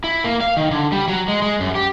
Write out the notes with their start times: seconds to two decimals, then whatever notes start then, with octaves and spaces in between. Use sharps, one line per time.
0.04 E4
0.24 A#3
0.41 F5
0.57 D#3
0.71 D3
0.92 G3
1.08 F#3
1.28 G#3
1.42 G#3
1.60 F#2
1.75 G4